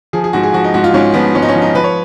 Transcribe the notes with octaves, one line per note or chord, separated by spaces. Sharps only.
F3 G#4
G#4
G#2 F#4
G#4
F3 F#4
D#4
G#2 F#4
F4
G#2 C#4
F3 B3
G#2 C#4
D#4
C#4
F3
D#4
F3 B4
C#5